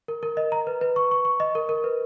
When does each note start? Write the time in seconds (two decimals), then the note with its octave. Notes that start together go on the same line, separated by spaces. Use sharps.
0.08 A#4
0.23 A#4
0.37 D#5
0.52 A#5
0.67 B4
0.81 B4
0.96 C#6
1.11 C#6
1.25 C#6
1.40 D#5
1.55 A#4
1.69 A#4
1.84 B4